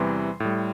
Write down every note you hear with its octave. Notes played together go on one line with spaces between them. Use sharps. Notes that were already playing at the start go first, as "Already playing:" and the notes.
Already playing: E2 C3 E3 G3 C6
A2 G3